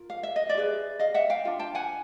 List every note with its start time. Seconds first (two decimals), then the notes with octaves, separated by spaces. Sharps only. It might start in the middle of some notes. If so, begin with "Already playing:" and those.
Already playing: F4 A#4
0.10 F5
0.23 E5
0.36 D#5
0.49 F4 D5 E5
0.57 G#4 B4
0.99 D#5 F5
1.14 E5 F#5
1.30 F5 G5
1.45 D4 F4
1.59 G5 A5
1.75 F#5 G#5